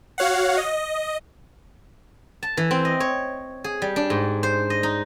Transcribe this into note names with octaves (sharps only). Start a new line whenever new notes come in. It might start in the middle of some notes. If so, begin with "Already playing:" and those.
F#4 C#5 F5 F#5
D#5
A5
E3
C4
D#5
C#5
G#4
G3
D4
G#2
C5
D#5
D#4